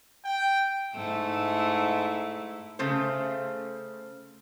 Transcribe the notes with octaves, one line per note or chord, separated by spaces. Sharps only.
G5
G#2 A3 E4
C#3 A3 C5